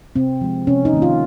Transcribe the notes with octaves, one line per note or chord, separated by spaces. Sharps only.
C3 C4
F3 G#3
C3 C#4
D#4
D#3 A#3
F4